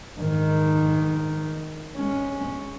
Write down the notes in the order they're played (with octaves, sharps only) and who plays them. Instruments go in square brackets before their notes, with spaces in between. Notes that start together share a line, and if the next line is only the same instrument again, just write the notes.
[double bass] G#2 D#3
G#3 C#4